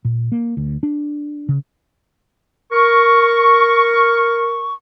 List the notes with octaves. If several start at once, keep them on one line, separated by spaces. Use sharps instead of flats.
A#2
A#3
D2
D4
C#3
A#4 C#6